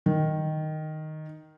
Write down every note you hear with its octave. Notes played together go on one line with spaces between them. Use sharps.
D#3